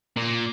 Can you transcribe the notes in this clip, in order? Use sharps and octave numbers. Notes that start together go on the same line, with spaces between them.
A#2